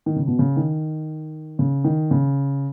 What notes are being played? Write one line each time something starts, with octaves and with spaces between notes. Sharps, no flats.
D#3
C#3
B2
C#3
D#3
C#3
D#3
C#3